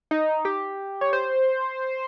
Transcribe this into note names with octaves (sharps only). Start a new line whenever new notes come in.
D#4
G4
C#5
C5